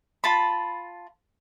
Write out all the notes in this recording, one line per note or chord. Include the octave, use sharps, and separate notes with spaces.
F4 A5 B5